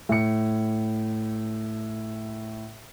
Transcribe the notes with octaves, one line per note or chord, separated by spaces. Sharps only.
A2 C#7